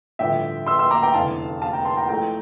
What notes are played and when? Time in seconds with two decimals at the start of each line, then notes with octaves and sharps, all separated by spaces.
0.19 A1 G2 D3 F3 E5 G5
0.66 C6 E6
0.79 C6 E6
0.90 A#5 D6
1.02 G5 A#5
1.14 F1 E2 D3 F5 A5
1.62 F5 A5
1.73 G5 A#5
1.85 A5 C6
1.97 G5 A#5
2.09 F2 E3 A3 G5 A#5